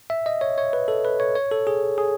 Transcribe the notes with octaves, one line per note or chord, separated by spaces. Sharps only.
E5
D#5
C#5
C#5
B4
A4
B4
C#5
C#5
A4
G#4
G#4